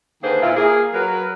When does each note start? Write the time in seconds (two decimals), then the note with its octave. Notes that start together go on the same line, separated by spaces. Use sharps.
0.23 D3 D#3 A#3 G#4 B4 C5
0.42 A#2 E4 F4
0.56 A#3 G#4
0.94 F#3 A#4 B4